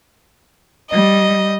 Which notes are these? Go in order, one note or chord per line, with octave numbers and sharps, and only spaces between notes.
G3 D#5